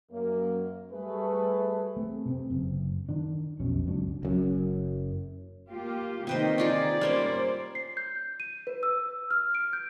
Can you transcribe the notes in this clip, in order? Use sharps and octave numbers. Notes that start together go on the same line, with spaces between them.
F#2 A#3
G3 A3 G#4 B4
A3 C4
C3 B3 C4
F#1
D#3 D4
B1 F2 B2 C#4
F#1 C#2 F#3 D4
F#1 F#2
A#3 F4 G4
C3 D#3 A#3 D#4 B4 C5 G5
D#4 F4 G#4 D5
G3 A#3 C#4 C5
C7
G6
D#7
B4
E6
F6
D7
G6